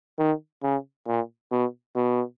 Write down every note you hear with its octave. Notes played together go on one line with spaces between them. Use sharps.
D#3
C#3
A#2
B2
B2